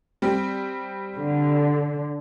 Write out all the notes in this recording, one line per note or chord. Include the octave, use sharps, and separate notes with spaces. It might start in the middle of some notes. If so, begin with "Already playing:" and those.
G3 C4
D3